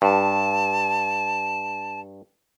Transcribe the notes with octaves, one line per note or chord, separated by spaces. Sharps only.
G2 A5